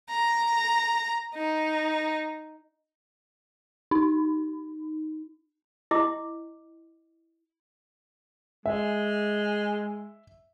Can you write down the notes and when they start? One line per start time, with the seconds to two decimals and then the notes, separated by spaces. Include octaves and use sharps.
0.11 A#5
1.35 D#4
3.91 D#4
5.91 E4 D#5 D6
8.66 G#3 E5